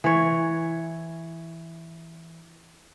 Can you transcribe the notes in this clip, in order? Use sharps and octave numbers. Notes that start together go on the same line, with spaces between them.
E3 C#5